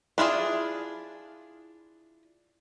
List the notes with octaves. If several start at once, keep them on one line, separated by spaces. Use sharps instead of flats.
D4 E4 F4 G#4